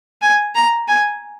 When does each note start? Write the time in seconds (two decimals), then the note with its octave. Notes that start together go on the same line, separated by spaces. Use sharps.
0.22 G#5
0.55 A#5
0.88 G#5